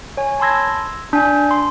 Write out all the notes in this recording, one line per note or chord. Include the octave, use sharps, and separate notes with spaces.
C#5 G#5
A5 B5 C6 E6 G#6 A#6
E6
D4 G#5
C6